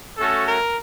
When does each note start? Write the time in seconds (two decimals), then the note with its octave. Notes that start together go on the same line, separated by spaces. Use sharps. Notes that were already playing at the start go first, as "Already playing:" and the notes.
0.18 A3 C#4 F#4 A4
0.47 A#4